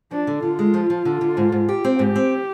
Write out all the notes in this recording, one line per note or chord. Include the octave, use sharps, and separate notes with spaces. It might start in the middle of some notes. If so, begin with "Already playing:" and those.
F3 D4
D3
D3 F4
G#3
F3
F3
D3
D3
G#2
G#2
G4
C4
G#2 G4
C4